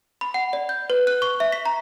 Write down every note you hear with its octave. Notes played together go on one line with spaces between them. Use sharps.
B5
F#5
D5
G6
B4
F#6
C#6
E5
B6
A#5